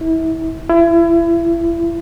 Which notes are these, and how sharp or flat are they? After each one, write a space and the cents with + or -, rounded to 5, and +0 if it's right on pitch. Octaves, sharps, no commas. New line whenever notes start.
E4 -30
E4 +30